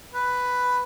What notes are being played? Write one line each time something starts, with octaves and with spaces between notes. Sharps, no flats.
B4